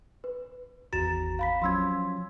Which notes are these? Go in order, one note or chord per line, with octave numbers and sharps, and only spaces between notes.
B4
G#1 E2 F#4 A#5 A6 E7
F5 B5 B6
F3 F#3 C#4 C6 E6 G#6